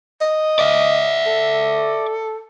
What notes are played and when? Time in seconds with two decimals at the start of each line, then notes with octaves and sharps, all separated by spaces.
0.21 D#5
0.59 D5 E5
1.26 A4